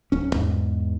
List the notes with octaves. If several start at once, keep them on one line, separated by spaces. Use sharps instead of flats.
D1 C#4
E2 G#2